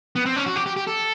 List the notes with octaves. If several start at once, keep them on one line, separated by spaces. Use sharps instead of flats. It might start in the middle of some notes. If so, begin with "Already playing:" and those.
B3
C4
C#4
F#4
G4
G4
G4
A4